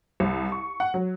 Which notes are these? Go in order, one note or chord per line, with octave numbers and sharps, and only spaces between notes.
C2
C#6
F#5
F#3